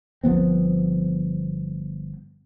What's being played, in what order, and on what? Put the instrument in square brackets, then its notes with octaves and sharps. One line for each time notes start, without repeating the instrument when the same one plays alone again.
[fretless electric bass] G1 F3 B3 C4